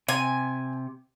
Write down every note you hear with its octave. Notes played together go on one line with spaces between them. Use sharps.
C3 G#5